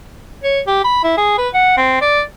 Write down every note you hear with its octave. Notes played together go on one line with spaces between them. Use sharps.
C#5
G4
B5
E4
G#4
B4
F#5
C4
D5